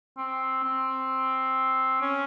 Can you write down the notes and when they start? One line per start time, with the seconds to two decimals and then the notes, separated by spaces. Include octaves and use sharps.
0.18 C4
0.63 C4
2.02 C#4